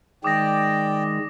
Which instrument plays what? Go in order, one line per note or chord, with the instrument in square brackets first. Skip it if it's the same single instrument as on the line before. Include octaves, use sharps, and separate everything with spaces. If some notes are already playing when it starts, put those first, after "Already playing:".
[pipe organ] D#3 G#3 [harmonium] D5 G5 [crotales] D6 D#6 A#6